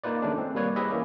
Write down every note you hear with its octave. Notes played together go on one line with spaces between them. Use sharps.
A#3 D#4 F4 B4 D5
D#3 G#3 A3 C#4 D4
C4
G3 A#3 B4 C#5 D5
E4 G4 G#4 B4 D#5 E5
E3 A#3 C#4